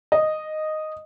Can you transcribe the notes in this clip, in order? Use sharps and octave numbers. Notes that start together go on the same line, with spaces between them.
D#5